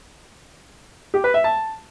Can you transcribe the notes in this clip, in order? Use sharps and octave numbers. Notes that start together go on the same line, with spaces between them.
G4
B4
E5
A5